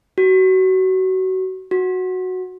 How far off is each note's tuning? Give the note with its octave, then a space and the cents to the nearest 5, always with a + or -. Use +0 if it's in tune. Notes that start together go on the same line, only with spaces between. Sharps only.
F#4 +25
F#4 -5